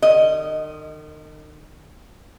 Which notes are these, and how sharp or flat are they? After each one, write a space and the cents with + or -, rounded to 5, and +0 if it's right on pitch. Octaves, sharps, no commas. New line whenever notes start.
D#3 -40 D#5 +0